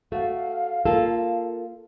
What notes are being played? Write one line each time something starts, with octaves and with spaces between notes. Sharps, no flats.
A3 F#4 F5
A#3 F4 A4